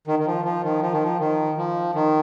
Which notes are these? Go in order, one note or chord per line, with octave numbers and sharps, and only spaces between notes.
D#3
D#3
F3
F3
D#3
F3
D#3
F3
D#3
F3
D#3